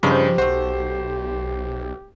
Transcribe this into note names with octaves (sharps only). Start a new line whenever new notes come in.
G2 C#3 F3 D#4 G4 C5
B1 A3 F#4 C5